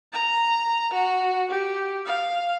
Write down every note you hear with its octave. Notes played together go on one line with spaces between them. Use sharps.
A#5
F#4
G4
F5